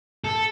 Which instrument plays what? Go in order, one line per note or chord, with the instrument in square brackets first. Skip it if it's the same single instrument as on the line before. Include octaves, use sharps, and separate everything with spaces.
[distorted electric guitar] A4